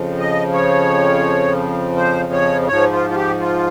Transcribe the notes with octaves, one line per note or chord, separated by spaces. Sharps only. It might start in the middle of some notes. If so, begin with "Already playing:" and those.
Already playing: F2 C#3 F3
D#5
C#5
C5
C#5
G#2 F3 C#5
F4
F4
G4
F4